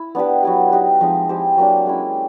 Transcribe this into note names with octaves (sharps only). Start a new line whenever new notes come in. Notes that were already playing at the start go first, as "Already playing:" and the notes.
Already playing: E4
B3 D4 G4 B4
F#3 B3 E4 G4
D#4 G4 B4
F3 G#3 C4 D#4
E4 G4 C5
F#3 A#3 D4
G#3 C#4 E4 G4